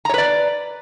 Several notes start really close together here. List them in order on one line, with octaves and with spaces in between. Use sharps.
A#5 C#5 B4 D5